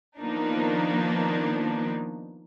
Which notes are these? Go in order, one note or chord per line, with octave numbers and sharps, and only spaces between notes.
D#3 F3 A#3 B3 D4 D#4